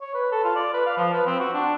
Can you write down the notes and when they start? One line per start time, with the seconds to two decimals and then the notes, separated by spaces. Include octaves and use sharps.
0.01 C#5
0.14 B4
0.32 A4
0.44 F4
0.56 D5
0.73 B4
0.86 F5
0.97 F3
1.13 B4
1.26 C4
1.40 F#4
1.53 D4